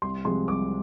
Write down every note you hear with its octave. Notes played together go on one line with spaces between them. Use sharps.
C2 C6
C3 F3 G#3 C6
C2 D6